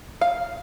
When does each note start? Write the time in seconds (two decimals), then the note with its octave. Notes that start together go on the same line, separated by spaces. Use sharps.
0.21 F5